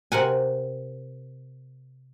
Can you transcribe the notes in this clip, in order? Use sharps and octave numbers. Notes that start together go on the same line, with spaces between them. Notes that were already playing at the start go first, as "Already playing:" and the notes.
C3 A#4 F#5 G#5